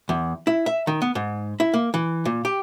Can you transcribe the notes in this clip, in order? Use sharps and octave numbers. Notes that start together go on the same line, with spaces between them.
E2
E4
E5
D#3
B3
G#2
E4
A#3
E3
A#2
G4